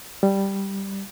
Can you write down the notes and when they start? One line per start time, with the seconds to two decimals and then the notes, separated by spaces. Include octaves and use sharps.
0.23 G3